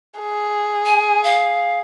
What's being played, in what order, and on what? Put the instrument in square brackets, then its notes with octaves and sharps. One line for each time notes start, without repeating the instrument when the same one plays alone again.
[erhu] G#4
[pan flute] G#5
F5